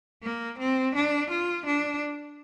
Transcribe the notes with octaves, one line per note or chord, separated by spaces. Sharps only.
A#3
C4
D4
F4
D4